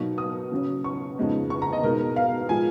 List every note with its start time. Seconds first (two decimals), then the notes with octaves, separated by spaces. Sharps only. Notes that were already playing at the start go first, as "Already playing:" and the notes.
Already playing: B2 F#3 A#3 D#4 C#6
0.18 D#6
0.51 C#3 F#3 C#4
0.84 C#6
1.17 F2 C#3 G#3 B3 D#4
1.50 C#6
1.62 A#5
1.73 D#5
1.83 B2 G#3 B3 D#4 A#4
2.16 F5
2.49 A#2 F3 G#3 G#5